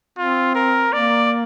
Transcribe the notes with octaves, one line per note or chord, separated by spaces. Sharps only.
C4 F4
A#4
A#3 D5